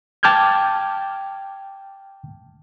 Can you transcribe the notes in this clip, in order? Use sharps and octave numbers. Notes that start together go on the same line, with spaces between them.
G5 A5 D6 F6 G6 G#6